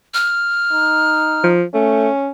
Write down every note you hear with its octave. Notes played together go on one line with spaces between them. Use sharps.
F6
D#4
F3
A3 C#4